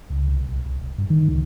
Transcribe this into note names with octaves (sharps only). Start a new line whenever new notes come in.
C#2
C2
B1
C2
D#1
G2
D#3
C#2